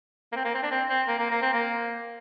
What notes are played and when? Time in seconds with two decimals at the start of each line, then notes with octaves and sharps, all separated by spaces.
0.32 A#3
0.36 C4
0.45 A#3
0.55 C4
0.63 D4
0.71 C4
0.90 C4
1.08 A#3
1.19 A#3
1.31 A#3
1.42 C4
1.54 A#3